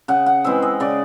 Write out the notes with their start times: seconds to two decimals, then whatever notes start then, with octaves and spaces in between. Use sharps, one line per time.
0.08 C#3 F#5
0.26 F#5
0.44 E3 G#3 C4 E5
0.62 D#5
0.80 C#3 D5